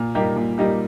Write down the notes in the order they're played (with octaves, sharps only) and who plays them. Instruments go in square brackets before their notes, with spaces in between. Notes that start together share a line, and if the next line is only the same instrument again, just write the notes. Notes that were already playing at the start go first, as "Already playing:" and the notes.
Already playing: [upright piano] A#2
G3 A#3 D#4 G4
A#2
G3 A#3 D#4 G4